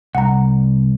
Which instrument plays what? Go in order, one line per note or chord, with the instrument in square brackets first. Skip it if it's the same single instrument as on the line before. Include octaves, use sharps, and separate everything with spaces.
[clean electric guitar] C2 [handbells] F#5 A#5